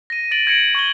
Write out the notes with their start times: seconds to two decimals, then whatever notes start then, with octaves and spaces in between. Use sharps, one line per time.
0.10 A#6 D#7
0.31 A6 A#6 D7 F#7
0.47 G#6 A#6 C#7 D7 F#7
0.75 C#6 G#6 F#7 G7